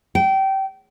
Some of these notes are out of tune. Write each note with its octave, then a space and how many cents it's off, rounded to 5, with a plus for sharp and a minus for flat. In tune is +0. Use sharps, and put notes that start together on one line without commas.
G5 -25